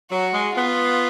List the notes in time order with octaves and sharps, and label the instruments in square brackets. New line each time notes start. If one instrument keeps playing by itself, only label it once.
[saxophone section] F#3 [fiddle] F#4
[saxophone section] G#3
[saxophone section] B3 [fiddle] F4